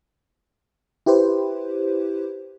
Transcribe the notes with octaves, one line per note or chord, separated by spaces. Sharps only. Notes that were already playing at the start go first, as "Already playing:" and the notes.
E4 G4 B4 C5